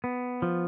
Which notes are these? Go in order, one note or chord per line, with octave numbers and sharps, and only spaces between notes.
B3
F3